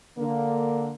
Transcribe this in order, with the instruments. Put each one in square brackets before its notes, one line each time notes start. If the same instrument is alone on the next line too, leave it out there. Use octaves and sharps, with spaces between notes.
[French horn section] D3 A#3